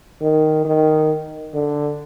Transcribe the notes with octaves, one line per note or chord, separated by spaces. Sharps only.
D#3
D#3
D3